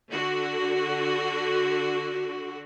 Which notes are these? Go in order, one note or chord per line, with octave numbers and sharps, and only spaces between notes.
D3 F#4